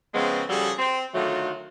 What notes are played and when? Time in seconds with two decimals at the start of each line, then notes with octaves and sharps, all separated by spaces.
0.14 C#3 F3 G#3 B3 C4
0.50 C#3 F3 G3 F#4 G#4 A4
0.79 C4
1.14 D3 D#3 F#3 A3 F4 F#4